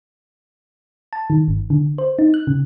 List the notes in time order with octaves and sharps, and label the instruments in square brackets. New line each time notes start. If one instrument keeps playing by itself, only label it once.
[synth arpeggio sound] A5
D#3
G1
D3
C5
D#4
F#6
C#3